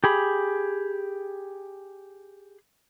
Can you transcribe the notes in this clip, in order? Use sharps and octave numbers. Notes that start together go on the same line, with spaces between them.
G4 G#4 B5